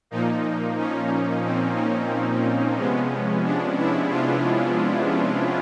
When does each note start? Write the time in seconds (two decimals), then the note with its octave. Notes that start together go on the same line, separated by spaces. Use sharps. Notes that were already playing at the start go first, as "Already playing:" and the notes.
0.11 A#2 F3 A#3 D#4
0.78 C#4
1.44 C4
1.76 C#4
2.76 C3 F3 G#3 B3
3.44 D4
3.77 E4
4.11 F4